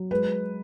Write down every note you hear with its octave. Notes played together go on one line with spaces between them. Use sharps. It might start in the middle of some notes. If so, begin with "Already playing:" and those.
Already playing: F#3
G#3 B4